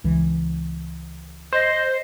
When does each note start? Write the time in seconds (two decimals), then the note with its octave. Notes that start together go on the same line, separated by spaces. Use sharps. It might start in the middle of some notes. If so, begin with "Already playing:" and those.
0.04 C#2 E3
1.53 C5 D#5